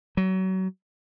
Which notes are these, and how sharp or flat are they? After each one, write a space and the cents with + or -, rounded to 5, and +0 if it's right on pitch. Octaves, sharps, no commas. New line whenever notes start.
F#3 +30